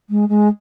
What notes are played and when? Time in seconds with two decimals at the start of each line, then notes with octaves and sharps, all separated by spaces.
0.09 G#3
0.28 G#3